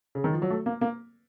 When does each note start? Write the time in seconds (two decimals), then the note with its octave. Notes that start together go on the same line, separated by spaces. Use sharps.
0.15 C#3
0.24 D#3
0.33 F3
0.42 F#3
0.50 A3
0.66 A#3
0.81 A#3